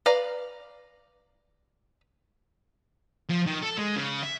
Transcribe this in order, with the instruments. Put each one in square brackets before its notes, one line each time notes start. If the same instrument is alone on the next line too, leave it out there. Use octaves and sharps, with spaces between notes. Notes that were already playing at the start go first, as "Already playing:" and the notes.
[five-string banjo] B4 D5 F5 A#5
[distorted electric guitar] F3
D#3
A4
G#3
C#3
E5